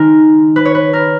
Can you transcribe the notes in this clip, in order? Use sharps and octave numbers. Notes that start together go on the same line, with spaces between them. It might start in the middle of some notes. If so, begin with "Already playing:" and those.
Already playing: D#3 G#3 A#4
B4
C#5
B4
A#4